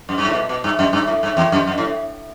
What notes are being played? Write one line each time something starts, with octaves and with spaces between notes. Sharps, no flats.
F#2
G2
A2
B2
B2
G2
F#2
G2
A2
G2
E2
F#2
F#2
A2